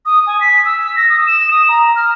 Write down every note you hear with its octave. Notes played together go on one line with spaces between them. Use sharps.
D#6
G#5
B6
E6
A#6
D#6
E7
D#6
A#5
F6